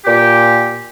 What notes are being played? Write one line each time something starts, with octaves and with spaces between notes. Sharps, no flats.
A#2 G4